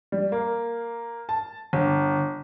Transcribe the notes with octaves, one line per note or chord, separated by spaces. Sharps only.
G3
A#3
A5
G1